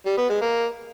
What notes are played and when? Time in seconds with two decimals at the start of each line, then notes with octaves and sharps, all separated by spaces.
0.06 G3
0.18 B3
0.30 G#3
0.42 A#3